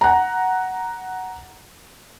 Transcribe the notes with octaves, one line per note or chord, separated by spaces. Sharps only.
F#5 A#5